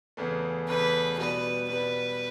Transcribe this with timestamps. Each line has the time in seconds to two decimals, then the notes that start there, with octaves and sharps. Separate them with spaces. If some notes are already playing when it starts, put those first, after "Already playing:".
0.17 E2 C#3 E3 A3
0.68 E2 C#3 E3 A3 B4
1.18 B2 G3 B3 B4
1.69 B2 G3 B3 B4